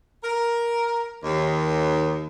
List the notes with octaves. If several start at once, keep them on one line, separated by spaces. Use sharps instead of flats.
A#4
D#2